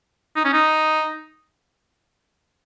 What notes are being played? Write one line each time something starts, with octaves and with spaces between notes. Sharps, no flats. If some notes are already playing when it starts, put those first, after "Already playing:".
D#4
C#4
D#4